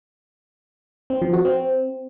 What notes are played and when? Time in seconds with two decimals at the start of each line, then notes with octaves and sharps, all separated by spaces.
1.10 C4
1.22 F3
1.33 F#4
1.45 C4